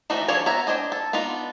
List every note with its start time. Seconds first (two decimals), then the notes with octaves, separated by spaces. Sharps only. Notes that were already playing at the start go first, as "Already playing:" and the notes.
0.10 E3 F3 A3 D#4 F#4
0.28 F3 D4 F4 G#4 C#5
0.46 B3 C#5 E5 A#5
0.67 D4 C5 D#5 G#5
0.92 A4
1.13 B3 D4 D#4 F4